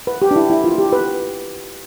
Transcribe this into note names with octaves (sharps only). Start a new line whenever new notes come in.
B4
G4
D4
E4
E4
F4
G4
B4